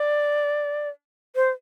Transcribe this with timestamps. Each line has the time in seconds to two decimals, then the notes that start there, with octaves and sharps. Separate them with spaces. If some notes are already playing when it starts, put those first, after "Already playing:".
Already playing: D5
1.36 C5